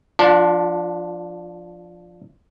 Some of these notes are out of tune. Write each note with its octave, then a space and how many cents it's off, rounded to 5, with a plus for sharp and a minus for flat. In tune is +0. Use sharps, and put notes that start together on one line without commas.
F3 +0 D4 +0 F4 +45